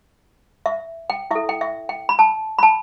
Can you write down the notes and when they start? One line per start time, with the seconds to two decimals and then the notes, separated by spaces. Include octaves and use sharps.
0.66 E5
1.10 G5
1.31 E4 A4 E5
1.49 G5
1.61 E5
1.89 G5
2.09 B5
2.19 A5
2.58 B5
2.63 A5